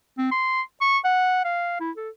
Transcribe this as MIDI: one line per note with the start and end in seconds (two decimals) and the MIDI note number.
0.18 0.29 60
0.31 0.62 84
0.81 0.98 85
1.04 1.44 78
1.45 1.75 77
1.80 1.91 64
1.97 2.09 69